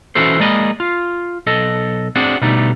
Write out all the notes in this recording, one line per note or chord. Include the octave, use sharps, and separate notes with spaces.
E3 C#4 E4 F#4 A4 C5
G#3 A#3 D5 D#5 A#5 B5
F4
B1 A4 D#5
C4 D4 F#4 G#4 D5
B2 D3 G3 A3 D#4 D5